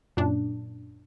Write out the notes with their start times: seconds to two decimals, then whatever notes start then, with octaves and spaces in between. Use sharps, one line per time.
0.17 F#2 A#2 D4